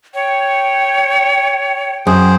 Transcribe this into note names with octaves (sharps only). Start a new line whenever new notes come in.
C#5 G5
F#2 G#4 C5